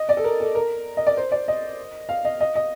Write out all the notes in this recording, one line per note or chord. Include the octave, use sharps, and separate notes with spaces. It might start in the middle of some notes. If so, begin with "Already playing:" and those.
Already playing: D#5
D5
A4
A#4
A4
A#4
D#5
D5
C5
D5
D#5
F5
D#5
D#5
D#5